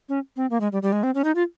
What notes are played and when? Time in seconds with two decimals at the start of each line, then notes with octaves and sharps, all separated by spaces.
0.09 C#4
0.36 C4
0.50 A#3
0.61 G#3
0.72 G3
0.82 G3
0.92 G#3
1.03 C4
1.15 C#4
1.24 D#4
1.35 F4